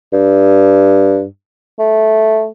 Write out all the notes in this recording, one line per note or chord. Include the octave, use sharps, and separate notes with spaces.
G2
A3